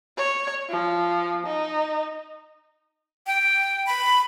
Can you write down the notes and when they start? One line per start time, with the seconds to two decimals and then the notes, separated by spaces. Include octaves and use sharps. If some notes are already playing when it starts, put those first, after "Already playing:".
0.17 C#5
0.69 F3
1.46 D#4
3.27 G5
3.87 B5